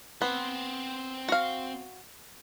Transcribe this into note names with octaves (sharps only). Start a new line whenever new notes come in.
B3 C4 C5
F#4 F5